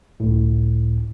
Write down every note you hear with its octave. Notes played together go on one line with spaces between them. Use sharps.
G1 C#2 A2